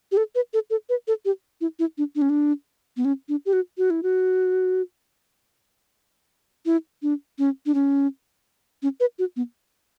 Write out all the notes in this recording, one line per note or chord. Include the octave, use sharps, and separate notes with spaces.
G4
A4
B4
A4
A4
B4
A4
G4
E4
E4
D4
D4
C#4
D4
B3
C#4
D4
G4
F#4
F#4
E4
F#4
E4
D4
C#4
D4
C#4
C#4
B4
F#4
B3